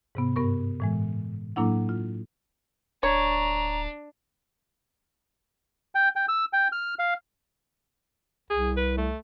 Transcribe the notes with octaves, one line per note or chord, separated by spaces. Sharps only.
G#2 C3 B3
G2 B3 A#4 C#6
A2 E3 G#3
A2 F#3 A#3 D4 E4 F#5
F4
D1 D4 C#5 A#5
G5
G5
E6
G5
F6
F5
C2 G#4
B4
A3